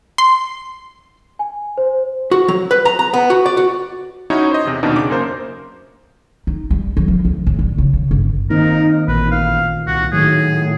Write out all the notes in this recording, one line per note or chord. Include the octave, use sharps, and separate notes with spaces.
C6
G#5
C5
F#4
F#3
B4
A#5
A#5
B3
F#4
D5
F#4
C#4 D#4 E4 F#4 C#5 D#5
C5 D#5
E2 C3
D#2 B2 D4 D#4
C#3 D6
F#2 A#3 A#4 C5
D#4
G3
F#3
F3
D2
A2
D3
C#3
C#3
G1
D#3 A#3 C4 D#4 A#4
A1 A#2 B4
F5
C2 F#4
A2 D#3 F#3 G#4